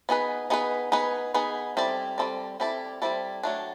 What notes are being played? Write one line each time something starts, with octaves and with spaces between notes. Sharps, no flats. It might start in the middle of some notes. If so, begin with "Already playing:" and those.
B3 D#4 G#4 B4
B3 D#4 G#4 B4
B3 D#4 G#4 B4
B3 D#4 G#4 B4
G3 C4 E4 A4 D5
G3 C4 E4 A4 D5
G3 C4 E4 A4 D5
G3 C4 E4 A4 D5
F#3 A3 D4